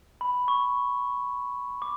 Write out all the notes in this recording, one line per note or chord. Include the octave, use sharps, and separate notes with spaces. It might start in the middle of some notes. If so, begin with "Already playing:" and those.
B5
C#6
D6